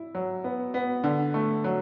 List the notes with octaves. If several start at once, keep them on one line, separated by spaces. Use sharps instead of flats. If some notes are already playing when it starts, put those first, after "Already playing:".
Already playing: E4
F#3
B3
B3
D3
A3
F#3